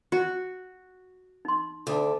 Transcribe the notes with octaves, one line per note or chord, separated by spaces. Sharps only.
F#4
D#4 C6
D2 D3 D#6